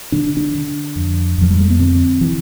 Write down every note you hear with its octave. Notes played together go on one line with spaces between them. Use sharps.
D3 D4
D4
D3
F2
F2 F3
G3
A3
B3
D3 C4
D3 E3